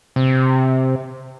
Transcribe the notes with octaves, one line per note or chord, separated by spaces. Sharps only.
C3